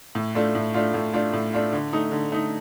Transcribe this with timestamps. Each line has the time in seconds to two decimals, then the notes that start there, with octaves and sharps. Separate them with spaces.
0.15 A2
0.35 A3 D4 F4
0.55 A2
0.74 A3 D4 F4
0.94 A2
1.14 A3 D4 F4
1.33 A2
1.53 A3 D4 F4
1.73 D3
1.93 A3 D#4
2.12 D3
2.32 A3 D#4